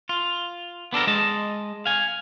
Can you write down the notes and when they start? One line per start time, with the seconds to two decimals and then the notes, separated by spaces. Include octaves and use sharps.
0.09 F4
0.93 B3 D4 A4 A#4
1.07 G#3 D#5 A5
1.86 F5 G#5